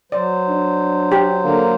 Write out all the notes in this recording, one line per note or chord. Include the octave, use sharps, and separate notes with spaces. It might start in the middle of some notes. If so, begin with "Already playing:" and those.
F#3 C5 D5
D4
G4
D3 A#3